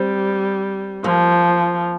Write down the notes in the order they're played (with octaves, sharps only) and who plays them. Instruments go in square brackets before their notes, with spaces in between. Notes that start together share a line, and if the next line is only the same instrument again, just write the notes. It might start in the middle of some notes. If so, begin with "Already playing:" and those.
Already playing: [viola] G3 [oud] C4
[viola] F3 [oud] A#3